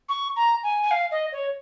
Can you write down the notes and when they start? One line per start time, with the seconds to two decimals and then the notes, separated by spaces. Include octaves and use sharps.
0.09 C#6
0.36 A#5
0.63 G#5
0.83 G#5
0.91 F5
1.11 D#5
1.32 C#5